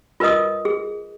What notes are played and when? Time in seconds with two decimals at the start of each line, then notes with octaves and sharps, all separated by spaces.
0.20 F4 A#4 B4 D#5 D#6
0.65 G#4